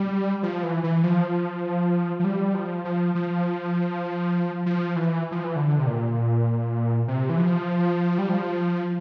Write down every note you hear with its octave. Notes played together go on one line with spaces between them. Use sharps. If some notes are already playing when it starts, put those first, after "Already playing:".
Already playing: G3
F3
E3
E3
F3
F3
G3
F3
F3
F3
F3
E3
F3
E3
D3
C3
A#2
C3
E3
F3
G3
F3